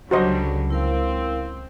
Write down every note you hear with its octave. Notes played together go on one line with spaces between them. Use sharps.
C#2 D3 F#3 G3 F#4 C5 D#5
C4 E4 A#4 F5